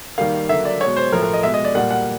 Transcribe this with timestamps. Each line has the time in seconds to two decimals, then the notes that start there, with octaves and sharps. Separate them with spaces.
0.18 D#3 G3 A#3 F5
0.49 D3 F#3 A#3 E5
0.65 D5
0.81 B2 G#3 C#5
0.96 C5
1.12 A2 F3 A3 A#4
1.23 A#4
1.33 D#5
1.43 B2 G#3 E5
1.54 D#5
1.64 D5
1.74 A#2 G3 A#3 F#5
1.91 F#5